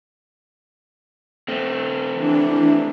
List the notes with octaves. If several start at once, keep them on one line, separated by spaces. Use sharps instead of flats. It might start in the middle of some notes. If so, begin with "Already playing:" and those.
A3 C4
E3 D4